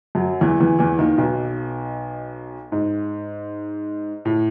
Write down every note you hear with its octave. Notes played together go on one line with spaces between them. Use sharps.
F#2 F#3
E2 E3
E2 E3
E2 E3
D#2 D#3
B1 B2
G#2
A2